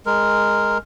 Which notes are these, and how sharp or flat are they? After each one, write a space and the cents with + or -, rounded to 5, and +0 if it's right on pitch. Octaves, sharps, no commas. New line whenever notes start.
G#3 +0 A#4 +0